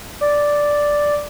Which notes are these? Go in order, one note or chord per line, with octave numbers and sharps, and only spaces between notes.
D5